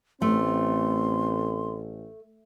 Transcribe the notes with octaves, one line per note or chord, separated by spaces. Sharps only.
A1 A3 C4 C6